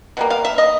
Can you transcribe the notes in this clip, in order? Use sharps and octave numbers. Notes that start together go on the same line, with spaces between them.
B2 G3 A#3
F5
E5
D#5